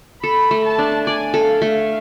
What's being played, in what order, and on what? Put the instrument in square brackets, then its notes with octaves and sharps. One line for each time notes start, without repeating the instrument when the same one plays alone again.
[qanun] A4 [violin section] B5
[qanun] A3
[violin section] A5
[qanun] D4
[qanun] D5 [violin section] G#5
[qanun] A4
[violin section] F5
[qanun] A3